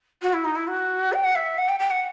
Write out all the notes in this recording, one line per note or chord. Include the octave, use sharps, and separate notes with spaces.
F#4
E4
D#4
E4
F#4
G5
F#5
E5
F#5
G5
G5
F#5